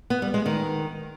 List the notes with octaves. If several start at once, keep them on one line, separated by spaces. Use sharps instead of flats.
B3
G3
G#3
D#3